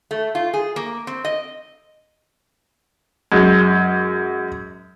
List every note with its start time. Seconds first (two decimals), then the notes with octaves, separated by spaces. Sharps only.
0.11 A3
0.35 F4
0.53 G#4
0.76 A#3
1.07 C4
1.25 D#5
3.32 F#2 G#3